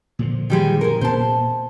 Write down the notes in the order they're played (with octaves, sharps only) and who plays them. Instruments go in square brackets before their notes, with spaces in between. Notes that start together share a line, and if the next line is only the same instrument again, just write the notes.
[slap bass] A#2 D3 F3
[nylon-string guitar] D#3 G3 G#3
G#3 A#4
[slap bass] A#2 A#3 B3 [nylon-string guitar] C5 A5